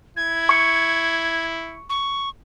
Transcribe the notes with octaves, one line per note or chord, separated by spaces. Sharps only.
E4 G#6
C#6 C#7
C#6